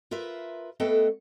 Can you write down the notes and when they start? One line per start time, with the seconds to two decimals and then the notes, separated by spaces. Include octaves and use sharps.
0.11 F4 A#4 B4 E5
0.80 A3 B3 A4 B4 D#5 G5